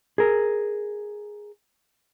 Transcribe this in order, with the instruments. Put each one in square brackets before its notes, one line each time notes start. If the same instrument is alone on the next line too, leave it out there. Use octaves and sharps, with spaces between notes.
[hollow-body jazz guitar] G#4 A#4